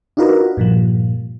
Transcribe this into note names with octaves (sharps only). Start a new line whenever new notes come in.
D4 D#4 F4 F#4 A#4 B4
G2 A#2 F3